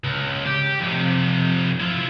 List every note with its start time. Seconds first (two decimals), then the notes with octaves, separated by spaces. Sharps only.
0.04 C#2
0.47 G4
0.81 F2 C3
1.80 E4 F4